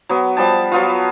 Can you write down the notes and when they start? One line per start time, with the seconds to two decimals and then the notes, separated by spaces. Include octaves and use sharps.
0.09 F#3 B3
0.37 F3 G3 A5
0.72 F#3 B3 F4